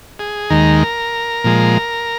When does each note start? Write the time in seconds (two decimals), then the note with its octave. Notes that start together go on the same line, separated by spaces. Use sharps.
0.19 G#4
0.50 D#2 D#3 G#3 A#4
1.44 A#2 F3 G#3